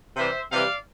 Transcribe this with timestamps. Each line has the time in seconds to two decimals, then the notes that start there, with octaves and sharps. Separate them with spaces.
0.16 C3 E3 G3 C5 E5
0.51 C3 E3 G3 D5 F5